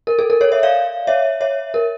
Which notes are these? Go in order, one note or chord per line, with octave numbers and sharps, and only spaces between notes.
A#4
A4
A#4
A4 C#5
C#5 E5
D5 F5
C#5 E5
C#5 E5
A#4